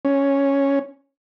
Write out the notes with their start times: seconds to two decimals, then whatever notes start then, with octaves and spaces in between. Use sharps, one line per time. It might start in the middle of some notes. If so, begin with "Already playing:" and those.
0.05 C#4